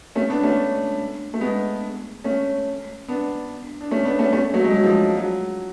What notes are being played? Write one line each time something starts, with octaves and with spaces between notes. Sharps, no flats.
A3 C#4
B3 D4
A3 C#4
A3
G#3 B3
A3 C#4
B3 D4
D4
A3 C#4
B3 D4
A3 C#4
A3 C#4
F#3 A3
G#3
F#3
F3 G#3
F#3